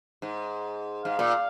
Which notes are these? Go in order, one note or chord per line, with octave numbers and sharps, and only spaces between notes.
G#2
G#2 F5
A#2